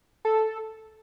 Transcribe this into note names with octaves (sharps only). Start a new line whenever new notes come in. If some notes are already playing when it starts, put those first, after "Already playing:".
A4